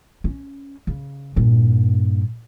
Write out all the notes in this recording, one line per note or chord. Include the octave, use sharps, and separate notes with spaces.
C#4
C#3
G2 A#2